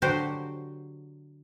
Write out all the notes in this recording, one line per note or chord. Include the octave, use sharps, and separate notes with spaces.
D3 F#3 F#4 G4 C5